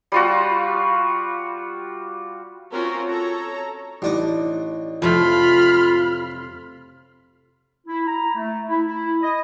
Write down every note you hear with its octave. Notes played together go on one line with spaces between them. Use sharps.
G3 F4 F#4
C4 C#4 F4 F#4 A#4
A4 C#5 A#5
A1 D4 D#4
F2 C3 A3 F4 B5 F6
E4
A#5
A3
E4
E4
D#5